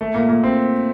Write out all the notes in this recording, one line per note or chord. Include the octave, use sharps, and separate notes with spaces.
A3
A#2
A#2
C4